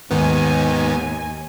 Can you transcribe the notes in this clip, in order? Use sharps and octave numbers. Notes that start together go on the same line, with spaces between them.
D#2 G#2 D#3 B3 G#5